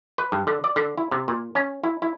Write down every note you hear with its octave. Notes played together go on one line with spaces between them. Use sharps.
B4
G2
D3
D5
D3
E4
C3
A#2
C#4
E4
E4